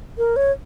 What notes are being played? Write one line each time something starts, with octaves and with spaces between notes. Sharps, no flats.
A#4
C#5